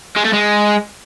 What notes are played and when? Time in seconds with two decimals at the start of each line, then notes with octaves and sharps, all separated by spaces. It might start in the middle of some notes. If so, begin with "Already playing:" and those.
0.17 G#3
0.25 A3
0.34 G#3